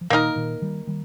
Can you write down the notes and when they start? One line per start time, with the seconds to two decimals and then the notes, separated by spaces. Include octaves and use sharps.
0.01 F3
0.10 A#2 D#3 A#3 D#4 A#4
0.36 A#2 D#3
0.62 D#3 G3
0.87 D#3 G3